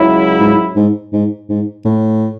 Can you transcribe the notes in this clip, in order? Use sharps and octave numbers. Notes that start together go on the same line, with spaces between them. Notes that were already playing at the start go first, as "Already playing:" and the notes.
Already playing: C#2 C#3 F#3 C#4 E4
G#2
G#2
G#2
G#2
A2